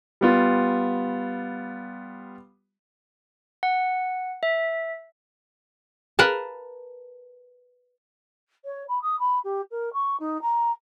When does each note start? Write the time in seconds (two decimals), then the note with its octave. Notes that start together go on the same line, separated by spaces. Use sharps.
0.21 G3 B3 F4
3.63 F#5
4.43 E5
6.19 A#4 B4 F5 A5
8.65 C#5
8.88 B5
9.02 D#6
9.19 B5
9.44 G4
9.71 A#4
9.93 C#6
10.20 D#4
10.42 A#5